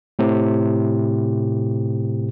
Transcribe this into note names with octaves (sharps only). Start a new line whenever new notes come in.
A2 C3